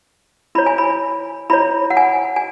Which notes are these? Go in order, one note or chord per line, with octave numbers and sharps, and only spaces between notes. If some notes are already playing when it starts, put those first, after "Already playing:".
E4 C#5 B5
G#5
B5
E4 C#5 B5
F#5
G#5
G#5